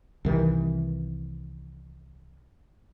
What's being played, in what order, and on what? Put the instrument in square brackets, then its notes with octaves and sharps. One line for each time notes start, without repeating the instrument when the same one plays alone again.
[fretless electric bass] C2 D#3 E3